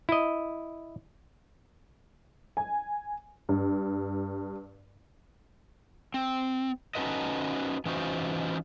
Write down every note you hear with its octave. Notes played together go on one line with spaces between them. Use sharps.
E4 D#5
G#5
G2
C4
C#4 D#4 F#4 A4 B4 D#5
E3 C#4 D#4 F4 F#4 C5